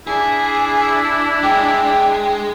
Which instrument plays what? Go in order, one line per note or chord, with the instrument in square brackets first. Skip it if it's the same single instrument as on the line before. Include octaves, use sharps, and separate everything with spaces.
[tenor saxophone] D4 [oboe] E4 [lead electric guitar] G#4
[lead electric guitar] G#3 [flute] G5